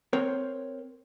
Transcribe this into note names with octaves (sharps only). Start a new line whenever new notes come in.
C4 A#4 C5 C#5